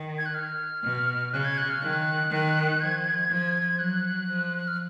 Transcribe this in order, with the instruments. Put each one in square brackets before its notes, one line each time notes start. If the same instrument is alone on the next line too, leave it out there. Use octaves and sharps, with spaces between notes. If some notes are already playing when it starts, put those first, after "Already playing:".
Already playing: [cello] D#3
[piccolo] G#6
F#6
F6
[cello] B2
[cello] C#3 [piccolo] F#6
[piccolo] G#6
F#6
F6
[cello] D#3 [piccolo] F#6
[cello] D#3
[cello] F3 [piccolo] G#6
[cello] F3
[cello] F#3 [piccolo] F#6
[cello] F3
[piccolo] F#6
F6